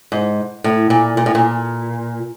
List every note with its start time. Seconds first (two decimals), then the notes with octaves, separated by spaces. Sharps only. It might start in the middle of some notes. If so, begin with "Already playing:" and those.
0.12 G#2
0.64 A2
0.90 A#2
1.17 A#2
1.26 A2
1.35 A#2